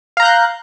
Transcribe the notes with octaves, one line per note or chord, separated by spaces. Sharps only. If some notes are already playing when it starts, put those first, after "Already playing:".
F5 A#5 F#6 G6